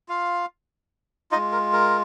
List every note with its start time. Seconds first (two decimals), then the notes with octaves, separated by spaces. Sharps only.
0.08 F4 F5
1.31 D#4 F4 D#5
1.35 G#3
1.52 A#4
1.73 A#4